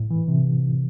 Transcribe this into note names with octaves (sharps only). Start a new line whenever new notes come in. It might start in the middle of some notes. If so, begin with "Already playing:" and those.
Already playing: A2
E3
C3